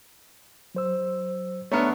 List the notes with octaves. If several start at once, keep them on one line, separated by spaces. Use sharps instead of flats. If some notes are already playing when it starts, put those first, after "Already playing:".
F#3 C5 E6
A3 B3 D4 C#5 A#5 F6